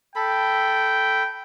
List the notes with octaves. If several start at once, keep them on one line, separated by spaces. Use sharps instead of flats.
A4 G5 B5